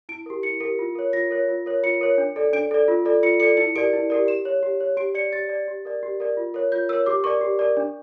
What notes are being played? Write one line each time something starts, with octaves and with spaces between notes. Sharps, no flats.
E4 D7
G4 A#4
E4 C#7
G4 A#4
F4
A#4 C#5
F4 A#6
A#4 C#5
F4
A#4 C#5
F4 C#7
A#4 C#5
D4
A4 D5
D4 D7
A4 D5
F4
A4 D5
F4 C#7
A4 D5 C#7
E4 C#7
G4 A#4 D5 D7
E4
G4 A#4 D5
G4 E7
C#5
G4
C#5
G4 D7
D5 C#7
G4 A6
D5
G4
A#4 D5
G4
A#4 D5
F4
A#4 C#5
F4 G6
A#4 C#5 E6
G4 D6
A#4 D5 C#6
G4
A#4 D5
D4